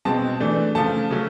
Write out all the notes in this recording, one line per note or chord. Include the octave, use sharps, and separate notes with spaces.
B2 G#3 C4 A5
E3 A3 D4
C#3 F3 A3 A5
C#3 F#3 A3 C#4